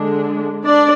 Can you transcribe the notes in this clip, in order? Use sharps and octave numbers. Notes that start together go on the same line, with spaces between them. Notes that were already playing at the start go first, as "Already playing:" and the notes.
Already playing: D3 G#3 D4
D4 D5